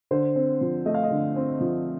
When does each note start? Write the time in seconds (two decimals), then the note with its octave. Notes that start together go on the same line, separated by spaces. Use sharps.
0.11 D3 C5
0.36 C4
0.61 F3
0.86 A3 D#5
0.94 F5
1.03 D#5
1.11 D3
1.36 C4
1.61 F3